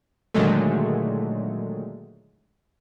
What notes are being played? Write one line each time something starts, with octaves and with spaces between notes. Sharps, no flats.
A#2 D3 D#3 F#3 G#3 A3